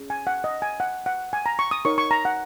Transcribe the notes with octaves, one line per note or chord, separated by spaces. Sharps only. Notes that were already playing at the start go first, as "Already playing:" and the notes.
Already playing: C#4 G#4 C#5
G#5
F#5
D#5
G#5
F#5
F#5
G#5
A#5
C#6
D#6
D#4 A#4 C#5 C#6
C#6
A#5
F#5